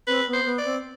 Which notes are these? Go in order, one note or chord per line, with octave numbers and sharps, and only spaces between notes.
C4 B4
B3
C5
B3
D5
C4